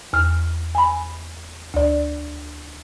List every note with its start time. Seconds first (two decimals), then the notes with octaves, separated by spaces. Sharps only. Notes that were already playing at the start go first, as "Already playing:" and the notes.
0.13 E2 F6
0.75 G#5 B5
1.74 D2 D5